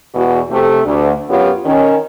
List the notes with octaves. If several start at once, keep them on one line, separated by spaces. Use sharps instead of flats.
E2 B2 F#4
C3 A3
D2
F#2 B3 F4 G4 C#5
D#3 C#4